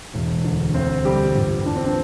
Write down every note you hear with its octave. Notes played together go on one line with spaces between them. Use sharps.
E1
D2 D3
D2 C4 C5
D3 G3 G4
G1
G2 E3 D4
C4
D4